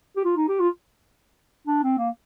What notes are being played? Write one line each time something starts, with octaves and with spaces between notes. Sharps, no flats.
G4
F4
D#4
G4
F4
D4
C4
A#3